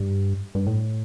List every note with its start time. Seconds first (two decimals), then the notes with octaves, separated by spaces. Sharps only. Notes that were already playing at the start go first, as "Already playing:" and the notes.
Already playing: G2
0.55 G2
0.67 A2